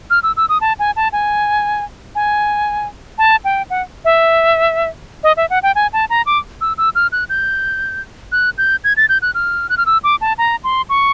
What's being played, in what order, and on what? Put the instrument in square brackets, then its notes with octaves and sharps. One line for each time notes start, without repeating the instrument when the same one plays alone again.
[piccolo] F6
E6
E6
D#6
A5
G#5
A5
G#5
G#5
A5
G5
F#5
E5
D#5
E5
F#5
G5
G#5
A5
A#5
D6
E6
E6
F6
F#6
G6
F#6
G6
G#6
A6
G6
F#6
F6
F#6
F6
E6
D6
A5
A#5
C6
C#6